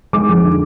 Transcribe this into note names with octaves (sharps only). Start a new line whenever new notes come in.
G#3 D6
F2
D3